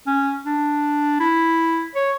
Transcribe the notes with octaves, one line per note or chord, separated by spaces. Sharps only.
C#4
D4
E4
C#5